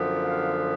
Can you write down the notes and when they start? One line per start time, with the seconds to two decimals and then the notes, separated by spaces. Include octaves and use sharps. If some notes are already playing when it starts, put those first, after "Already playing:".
Already playing: F#2 D3 F3 B3
0.24 F5